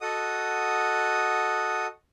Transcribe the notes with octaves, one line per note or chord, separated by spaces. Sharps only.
F#4 A4 D#5 F#5 D#6